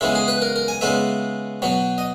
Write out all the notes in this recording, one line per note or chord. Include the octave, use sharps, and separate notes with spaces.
C#3 E3 G#3 B3 E4
G#4
B4
A#4
A#4
G#5
C#3 G#3 B3 E5
B2 F#3 B3
D#5